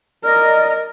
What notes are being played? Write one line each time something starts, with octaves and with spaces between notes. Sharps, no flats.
A#4 D5 D#5 F6